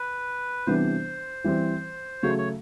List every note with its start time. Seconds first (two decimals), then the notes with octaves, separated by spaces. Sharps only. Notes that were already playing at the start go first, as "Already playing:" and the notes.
Already playing: B4
0.66 C3 E3 G3 B3 D4 C5
1.44 E3 G3 C4
2.23 C#3 F#3 A3 C#5
2.38 C#5